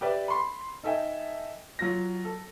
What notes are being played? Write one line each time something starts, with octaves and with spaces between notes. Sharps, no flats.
G4 B4 D5 E5
B5 C6
D#4 A4 D#5 E5 G5 G#5
F#3 F4 A#6
A4